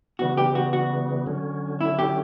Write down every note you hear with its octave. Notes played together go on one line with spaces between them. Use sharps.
C#3 E3 G3 B3 F#4
G4
F#4
F#4
D3 F#3 C#4
E4
G4